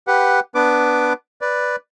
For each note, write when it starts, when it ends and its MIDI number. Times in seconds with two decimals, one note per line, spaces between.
0.07 0.40 67
0.07 0.40 71
0.07 0.40 78
0.55 1.13 59
0.55 1.13 62
0.55 1.13 71
0.55 1.13 86
1.41 1.76 71
1.41 1.76 74